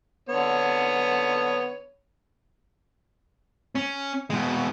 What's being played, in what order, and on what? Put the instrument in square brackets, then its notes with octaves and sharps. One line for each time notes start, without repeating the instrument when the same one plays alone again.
[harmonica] D3 B3 C#5
[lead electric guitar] C#4
B2 G#3